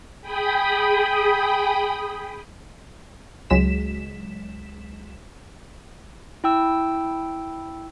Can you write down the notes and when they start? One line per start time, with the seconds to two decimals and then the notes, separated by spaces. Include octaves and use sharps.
0.21 G#4 G5 B5 D#6
3.50 C#2 F#3 G#3 B6 E7
6.44 E4 G5 E6